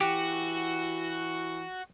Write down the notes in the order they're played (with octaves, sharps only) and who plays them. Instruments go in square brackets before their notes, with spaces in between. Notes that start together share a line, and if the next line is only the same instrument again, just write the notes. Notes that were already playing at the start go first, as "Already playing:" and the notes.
[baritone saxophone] E3 [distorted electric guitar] F#4 [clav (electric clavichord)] G4